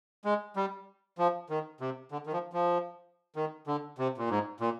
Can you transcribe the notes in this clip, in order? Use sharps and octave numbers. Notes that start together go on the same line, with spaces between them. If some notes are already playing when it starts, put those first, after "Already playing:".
G#3
G3
F3
D#3
C3
D3
D#3
F3
F3
D#3
D3
C3
A#2
G#2
A#2